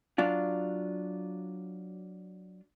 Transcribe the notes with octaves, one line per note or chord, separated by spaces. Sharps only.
F#3 D4 F4